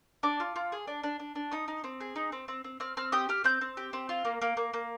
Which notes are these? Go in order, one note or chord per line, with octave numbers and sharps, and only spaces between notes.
D4 D6
F4
F4
G#4
D4
D4
D4
D4
D#4 D#6
D#4
C4
G#4
D#4
C4
C4
C4
C4 F6
C4 F6
G4 D#6
G4 F6
C4 G6
C4
G4
C4
F4
A#3
A#3
A#3
A#3